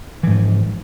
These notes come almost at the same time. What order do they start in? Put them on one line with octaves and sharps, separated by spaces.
E3 G#2 F3